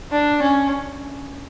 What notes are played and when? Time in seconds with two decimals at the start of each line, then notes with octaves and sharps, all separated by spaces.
0.12 D4
0.42 C#4